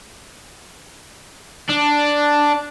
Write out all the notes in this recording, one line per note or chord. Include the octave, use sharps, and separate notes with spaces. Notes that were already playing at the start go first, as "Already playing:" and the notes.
D4